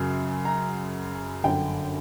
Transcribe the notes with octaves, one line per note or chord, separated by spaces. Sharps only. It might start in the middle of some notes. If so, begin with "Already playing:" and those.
Already playing: F#2 C#3 F#3
A#5
G1 F#2 D3 G5